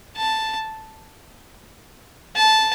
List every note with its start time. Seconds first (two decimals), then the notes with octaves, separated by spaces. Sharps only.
0.17 A5
2.36 A5